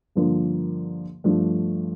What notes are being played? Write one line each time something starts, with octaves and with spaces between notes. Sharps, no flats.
G2 D3 F3 A#3
G2 F3 A3 D4